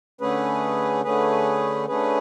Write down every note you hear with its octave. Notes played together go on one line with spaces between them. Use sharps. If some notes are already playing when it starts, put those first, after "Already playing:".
D3 A3 C#4 G#4 B4
D3 A3 C#4 G#4 B4
D3 A3 C#4 G#4 B4